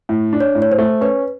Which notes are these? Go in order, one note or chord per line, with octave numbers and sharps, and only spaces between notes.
A2
D4
C#5
A2
C#5
C5
A3
C#4 B4